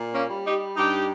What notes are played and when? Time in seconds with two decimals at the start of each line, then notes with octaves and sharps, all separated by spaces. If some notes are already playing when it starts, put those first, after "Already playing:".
Already playing: A#2
0.14 A#3 C#4
0.29 G3
0.45 D#4 G4
0.77 G2 D#4 G4